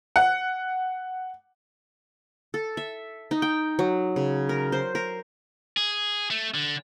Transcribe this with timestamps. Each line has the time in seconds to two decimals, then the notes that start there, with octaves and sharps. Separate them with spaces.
0.16 F#5
2.54 A4
2.77 E5
3.31 D#4
3.42 G5
3.79 F#3
4.16 C#3
4.49 A#4
4.72 C5
4.95 A#4
5.77 G#4
6.30 A3
6.54 D3